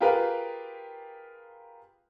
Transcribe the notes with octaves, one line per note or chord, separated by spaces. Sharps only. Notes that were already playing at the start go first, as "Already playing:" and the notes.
F4 G4 G#4 A#4 B4 F5